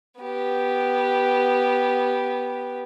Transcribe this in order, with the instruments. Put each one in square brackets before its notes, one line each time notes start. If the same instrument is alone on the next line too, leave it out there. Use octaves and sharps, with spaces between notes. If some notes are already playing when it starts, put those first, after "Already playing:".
[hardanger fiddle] B3 G4